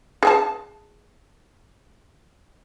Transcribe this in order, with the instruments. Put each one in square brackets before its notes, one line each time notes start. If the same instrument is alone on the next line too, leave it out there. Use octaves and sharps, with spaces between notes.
[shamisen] G#4 G#5 A5